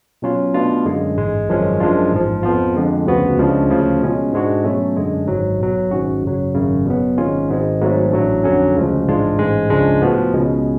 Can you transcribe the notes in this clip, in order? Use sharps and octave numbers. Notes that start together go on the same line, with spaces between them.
B2 F#3 C#4 F4
B2 A3 D4 F4
F#2 D3 G#3
A1 G#2 G#3
G#1 F#2 F3 G#3 C#4
F#2 F3 G#3 D4 F4
A1 G#2 F3
F2 F3 B3 F4
F2 D3 G#3
D2 C#3 F3 B3 F#4
C#2 C#3 F3 G#3 D4
D2 C#3 F3 A3
B2 G#3 C#4 F4
G#2 G#3 D4 F#4
B2 F#3 A3 C#4
F#2 D3 G#3
G#1 G#2 F#3
B1 B2 F#3
G#1 G#2 G#3 C#4 F#4
F#2 C#3 F#3
G#1 F#2 C#3
B2 F#3 B3
G#1 G#2 G#3 C#4 F4
G#1 G#2 G#3
G#1 G#2 F#3 A3
A1 A2 F#3 A3 D4
F2 D3 F#3 C#4
D2 C#3 F3 G#3
A1 G#2 G#3 D4 F4
A1 G#2 G#3
C#2 C#3 F3 G#3 D4
A2 F3 B3 F#4
C#2 B2 G#3 C#4